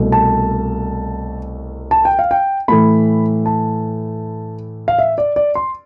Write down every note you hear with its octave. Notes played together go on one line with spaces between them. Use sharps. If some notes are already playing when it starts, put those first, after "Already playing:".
Already playing: C2 B2 A3
A5
A5
G5
F5
G5
A2 E3 A3 B5
A5
F5
E5
D5
D5
C6